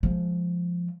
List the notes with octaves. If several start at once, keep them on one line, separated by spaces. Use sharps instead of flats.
F3 G#3